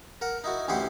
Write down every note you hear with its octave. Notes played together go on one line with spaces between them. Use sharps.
A#4 F#5
D#4 E4 F#4
A1 D2 E4 G4 F#5 C6